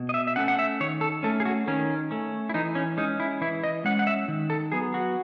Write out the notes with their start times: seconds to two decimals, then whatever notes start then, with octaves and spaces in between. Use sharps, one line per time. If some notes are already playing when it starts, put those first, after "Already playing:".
Already playing: B2
0.09 D#5
0.14 E5
0.27 E5
0.36 A3 C#4 F#5
0.48 F#5
0.59 E5
0.80 D#3 C#5
1.01 A4
1.23 A3 C#4 A4
1.40 G#4
1.45 F#4
1.67 D#3 C#4
2.11 A3 C#4
2.49 E4
2.54 E3 D#4
2.75 C#4
2.97 G#3 C#4 D#4
3.20 E4
3.41 E3 E4
3.64 D#5
3.84 G#3 C#4 F#5
3.99 F#5
4.07 E5
4.28 D#3
4.50 A4
4.72 F#3 B3 G#4
4.94 F#4